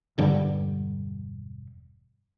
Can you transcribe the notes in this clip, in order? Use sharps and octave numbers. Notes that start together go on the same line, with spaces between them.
E1 G2 D3 G3